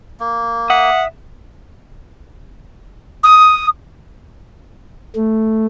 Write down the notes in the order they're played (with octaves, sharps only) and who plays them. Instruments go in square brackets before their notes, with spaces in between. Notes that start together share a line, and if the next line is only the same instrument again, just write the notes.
[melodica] A#3
[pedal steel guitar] E5 D#6 [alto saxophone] F#5
[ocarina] D#6
[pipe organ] A3